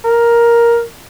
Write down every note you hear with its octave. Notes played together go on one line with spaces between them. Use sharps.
A#4